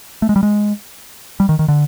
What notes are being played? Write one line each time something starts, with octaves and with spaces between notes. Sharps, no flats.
A3
G#3
G3
G#3
G3
D#3
D#3
D3